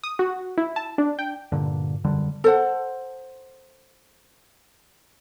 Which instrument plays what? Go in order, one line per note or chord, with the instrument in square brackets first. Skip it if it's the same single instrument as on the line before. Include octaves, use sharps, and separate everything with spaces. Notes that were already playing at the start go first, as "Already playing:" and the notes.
[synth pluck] D#6
F#4
E4
A5
D4
G5
[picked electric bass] G2 A#2 D3
E1 F#2 D3 G3
[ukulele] A4 C5 F#5